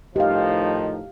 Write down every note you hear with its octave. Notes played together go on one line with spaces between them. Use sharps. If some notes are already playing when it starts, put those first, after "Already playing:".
A2 D#3 F3 D#4 G4 F5